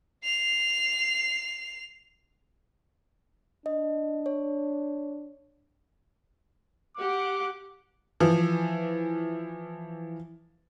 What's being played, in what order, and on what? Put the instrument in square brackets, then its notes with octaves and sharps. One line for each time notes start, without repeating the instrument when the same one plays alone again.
[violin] C7 F7
[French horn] D4 [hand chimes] D#5
[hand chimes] C#5
[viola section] G4 F#5 [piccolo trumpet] D6
[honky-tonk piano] E3 F3